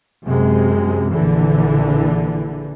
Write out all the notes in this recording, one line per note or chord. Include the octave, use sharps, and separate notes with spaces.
F#2 C3 G#3
A#1 D3 E3